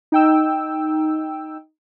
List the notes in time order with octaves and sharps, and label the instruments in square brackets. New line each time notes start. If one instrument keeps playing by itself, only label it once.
[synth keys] D#4 G5 E6